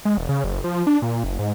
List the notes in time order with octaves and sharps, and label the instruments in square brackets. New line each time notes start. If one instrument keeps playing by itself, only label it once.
[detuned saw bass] G#3
E1
C#3
F#1
F3
D4
A#2
F#1
G#2